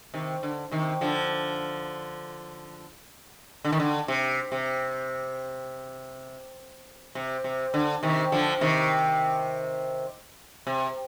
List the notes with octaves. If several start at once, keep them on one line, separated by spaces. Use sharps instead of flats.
C3 D#3
D3
C3 D#3
D3 F3
D3
D#3
D3
C3
C3
C3
C3
D3
C3 D#3
D3 F3
C3 D#3
C3